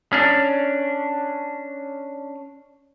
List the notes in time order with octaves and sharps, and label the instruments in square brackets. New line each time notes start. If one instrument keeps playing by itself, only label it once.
[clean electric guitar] C#4 D4